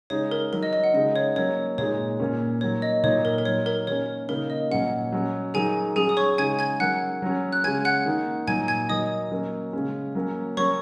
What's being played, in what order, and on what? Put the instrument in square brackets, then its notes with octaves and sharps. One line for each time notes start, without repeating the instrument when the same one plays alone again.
[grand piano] C#3 G#3 D#4 [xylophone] C#5
[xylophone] A#4
[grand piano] D#3 F#3 D#4 [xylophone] A#4
[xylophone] D#5
D#5
F#5
[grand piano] C#3 G#3 D#4 [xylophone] D#5
[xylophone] C#5
[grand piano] F#3 A#3 C#4 [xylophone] C#5
[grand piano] A#2 G#3 D#4 [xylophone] C#5
[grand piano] A#2 A#3 C#4
[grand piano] D#3 F#3 A#3 [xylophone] C#5
[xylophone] D#5
[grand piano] A#2 F#3 D#4 [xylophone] C#5
[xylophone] A#4
A#4
[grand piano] F#3 D#4 [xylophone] C#5
[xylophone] A#4
[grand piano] D#3 A#3 C#4 [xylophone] C#5
[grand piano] C#3 A#3 D#4 [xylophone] A#4
[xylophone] D#5
[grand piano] A#2 F#3 C#4 [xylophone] F#5
[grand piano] F#3 C#4
[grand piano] D#3 F#3 D#4 [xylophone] G#4 G#5
[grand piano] F#3 C#4 [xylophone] G#4 G#5
[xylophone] D#6
C#5 C#6
[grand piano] C#3 G#3 D#4 [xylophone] G#5 G#6
[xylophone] G#5 G#6
[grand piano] D#3 F#3 C#4 [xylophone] F#5 F#6
[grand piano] F#3 C#4
[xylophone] F#6
[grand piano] C#3 G#3 C#4 [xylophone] G#5 G#6
[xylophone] F#5 F#6
[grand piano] D#3 A#3 D#4
[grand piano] A#2 F#3 D#4 [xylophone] G#5 G#6
[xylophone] G#5 G#6
[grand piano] D#3 F#3 D#4 [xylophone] D#5 D#6
[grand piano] F#3 A#3 C#4
C#3 G#3 C#4
F#3 A#3 C#4
[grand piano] F#3 A#3 C#4 [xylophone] C#5 C#6